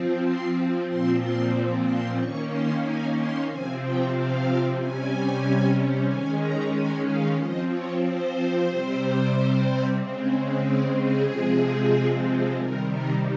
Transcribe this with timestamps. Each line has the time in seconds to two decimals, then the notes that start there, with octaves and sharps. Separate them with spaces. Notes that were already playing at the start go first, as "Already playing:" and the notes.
Already playing: F3 C4
0.22 C6
0.87 A#2 F3 C4 C6
1.20 C6
1.84 C6
2.16 D#3 A#3 C#4 C#6
2.49 C6
2.81 G#5
3.15 C6
3.47 C3 F3 C4 G#5
3.79 G5
4.12 F5
4.76 C3 G3 C#4 G#5
6.06 D#3 G#3 C#4 G#5
6.39 A#5
6.71 G#5
7.04 F5
7.36 F3 C4 D#5
7.69 C#5
8.01 C5
8.67 C3 G3 C4
9.96 C#3 G#3 C4
10.61 C5
10.93 G#4
11.26 C3 F3 G#3 C4
12.56 C3 D#3 G3 A#4
12.89 A#4